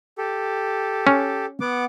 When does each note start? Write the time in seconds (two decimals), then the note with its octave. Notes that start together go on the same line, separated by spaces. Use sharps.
0.18 G4 A4
1.07 C#4
1.61 B3 F#5 D6